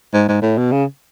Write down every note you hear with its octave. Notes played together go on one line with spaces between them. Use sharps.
G#2
G#2
A2
B2
C#3